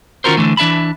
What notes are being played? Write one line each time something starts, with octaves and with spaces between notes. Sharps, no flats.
D#3 C#4 F4 F#4 A#4 C5
D3 E3 A3
E3 D4 E5 A5 B5